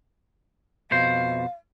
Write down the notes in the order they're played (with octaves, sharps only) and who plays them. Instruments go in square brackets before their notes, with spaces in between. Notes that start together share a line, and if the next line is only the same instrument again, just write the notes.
[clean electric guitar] F2 B2 C5 [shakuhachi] F5